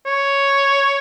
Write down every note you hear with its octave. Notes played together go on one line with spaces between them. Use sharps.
C#5